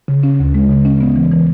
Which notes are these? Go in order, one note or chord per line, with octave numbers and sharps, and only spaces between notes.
C#3
C#4
D2
G#3
C#3
C#4
B3
E3
E3